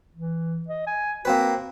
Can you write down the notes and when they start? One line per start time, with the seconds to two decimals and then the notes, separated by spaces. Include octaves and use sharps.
0.15 E3
0.68 D#5
0.87 G#5
1.25 A#3 C4 F#4 B4